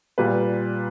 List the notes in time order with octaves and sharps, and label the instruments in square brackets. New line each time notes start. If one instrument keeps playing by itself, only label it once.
[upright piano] A#2 G3 B4